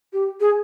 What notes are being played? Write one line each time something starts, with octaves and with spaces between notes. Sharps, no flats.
G4
G#4